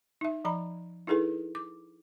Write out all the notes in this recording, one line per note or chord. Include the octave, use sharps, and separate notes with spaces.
D#4 E5
F3 D#5 A#5 B5
D#4 E4 G#4 A4 B4
D6